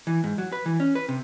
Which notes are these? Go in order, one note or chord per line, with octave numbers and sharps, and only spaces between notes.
E3
G#2
F#3
B4
E3
C#4
B4
C3